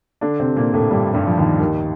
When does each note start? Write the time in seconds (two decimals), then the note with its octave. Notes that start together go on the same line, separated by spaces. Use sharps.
0.21 D3 D4
0.40 C3 C4
0.56 A#2 A#3
0.74 A2 A3
0.91 G2 G3
1.14 G2 G3
1.27 F3
1.37 D#2 D#3
1.60 D#2 D#3